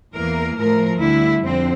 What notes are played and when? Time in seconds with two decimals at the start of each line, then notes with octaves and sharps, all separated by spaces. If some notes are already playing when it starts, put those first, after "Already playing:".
0.14 E2 E3 A#3 A#4
0.57 A2 F3 A3 A#4
1.00 D2 D3 G3 E4
1.43 F2 D3 C4